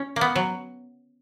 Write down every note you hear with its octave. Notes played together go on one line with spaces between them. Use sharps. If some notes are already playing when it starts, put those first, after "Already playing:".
Already playing: C#4
A#3
B3
F#3